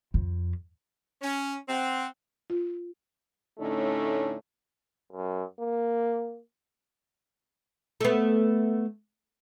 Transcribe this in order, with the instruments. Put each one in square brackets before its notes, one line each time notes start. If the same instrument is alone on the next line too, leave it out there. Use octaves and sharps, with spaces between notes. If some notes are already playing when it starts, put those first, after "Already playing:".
[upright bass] F2
[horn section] C#4
C4 F#5
[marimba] F4
[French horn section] A2 D3 A3 C#4 D#4
[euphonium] F#2
A#3
[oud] A3 B3